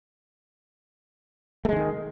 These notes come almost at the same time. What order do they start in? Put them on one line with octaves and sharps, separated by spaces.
A3 G#3 D3 D#3